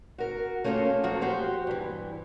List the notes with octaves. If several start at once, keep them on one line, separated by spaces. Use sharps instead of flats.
F#4 A#4
A3 A#3 C#4 F4 G#4 A4
F3 F#3 A#3 F#4 A#4
F#4 G4 C5
G2 E3